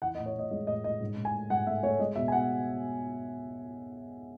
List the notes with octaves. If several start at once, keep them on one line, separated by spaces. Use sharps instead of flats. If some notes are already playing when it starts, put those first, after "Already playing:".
E3 F#5
D#5
A2
C#5
A2 D#5
G#3 D#5
A2 D#5
A2 D#5
G#2
G#2
G#5
A3
G#2 F#5
A3 E5
A3 C#5
G#3 D#5
B2 E5
G#5
B2 F#5